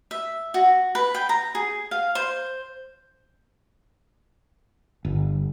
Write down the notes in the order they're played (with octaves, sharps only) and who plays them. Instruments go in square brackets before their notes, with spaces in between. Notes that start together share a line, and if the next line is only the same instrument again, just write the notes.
[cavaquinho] E5
F#4
B4
G5
A#5
G#4
F5
C5
[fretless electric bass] G1